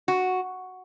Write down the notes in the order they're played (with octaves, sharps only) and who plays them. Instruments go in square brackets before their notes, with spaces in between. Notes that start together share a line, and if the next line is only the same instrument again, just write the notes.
[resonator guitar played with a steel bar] F#4